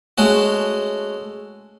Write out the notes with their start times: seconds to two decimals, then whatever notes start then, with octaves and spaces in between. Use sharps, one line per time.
0.18 G#3 A3 C#4 F#4